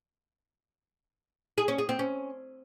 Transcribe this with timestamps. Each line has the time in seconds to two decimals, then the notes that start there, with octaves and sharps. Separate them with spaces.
1.58 G#4
1.68 C#4
1.78 G#4
1.89 C4
1.99 C#4